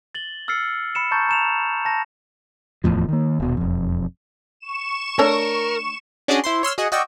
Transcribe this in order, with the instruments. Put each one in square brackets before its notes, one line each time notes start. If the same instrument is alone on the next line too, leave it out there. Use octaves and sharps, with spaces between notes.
[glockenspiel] A6 F#7 G7
E6 F6 A6 C7 C#7
B5 C#7 E7
A5 A#5 C#6 G6 A6
A#5 E7 F7
A5 A#6
[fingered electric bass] D1 E2 A2 F3
D#3 A#3
D#1 B2
E1 F2
[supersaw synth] C#6 E7
[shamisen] A3 D4 C#5 [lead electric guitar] A#4
[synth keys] C#4 D4 F#4 G#4 D5 D#5
E4 C5 C6
C#5 C6 E6 F6
F#4 G#4 D#5 F#5
F#4 D5 D#5 G5 C#6 E6